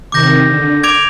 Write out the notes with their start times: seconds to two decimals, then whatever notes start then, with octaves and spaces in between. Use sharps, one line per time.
0.12 C3 D#3 D6 G6 A#6
0.48 D3
0.83 D6 G#6 D7 F7